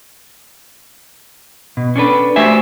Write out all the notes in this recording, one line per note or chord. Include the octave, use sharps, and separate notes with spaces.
B2
C#4 D4 A4 B4
A3 F#4 G4 C5 E5 G#5